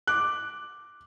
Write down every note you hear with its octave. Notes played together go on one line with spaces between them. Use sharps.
D6 F#6